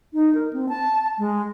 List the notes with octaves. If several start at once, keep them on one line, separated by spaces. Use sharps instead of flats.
D#4
A#4
C4
A5
G#3